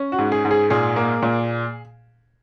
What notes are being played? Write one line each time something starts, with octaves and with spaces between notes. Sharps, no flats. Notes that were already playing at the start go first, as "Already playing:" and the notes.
Already playing: C#4
F#4
G#2
G#4
G#2
G#4
A#2 G#4
A#3
A#2